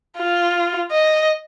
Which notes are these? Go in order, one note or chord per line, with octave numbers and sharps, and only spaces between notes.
F4
D#5